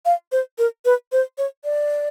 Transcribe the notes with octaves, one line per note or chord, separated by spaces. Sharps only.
F5
C5
A#4
B4
C5
C#5
D5